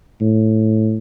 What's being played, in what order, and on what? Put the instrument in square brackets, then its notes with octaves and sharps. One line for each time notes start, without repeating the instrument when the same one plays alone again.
[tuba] A2